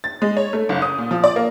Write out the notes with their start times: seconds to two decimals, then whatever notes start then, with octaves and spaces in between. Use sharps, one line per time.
0.04 A6
0.22 G#3
0.37 C#5
0.53 A3
0.69 F#1
0.82 D#6
0.98 A#2
1.11 F3
1.24 D5
1.36 A#3